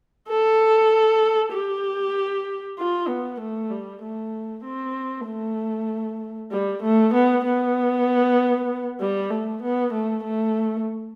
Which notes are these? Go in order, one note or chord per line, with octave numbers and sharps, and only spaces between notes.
A4
G4
F4
B3
A3
G3
A3
C4
A3
G3
A3
B3
B3
G3
A3
B3
A3
A3